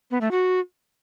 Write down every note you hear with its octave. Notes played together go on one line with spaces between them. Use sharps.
B3
A3
F#4